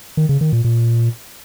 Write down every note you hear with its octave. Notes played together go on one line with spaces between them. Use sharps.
D#3
C#3
D#3
A#2
A#2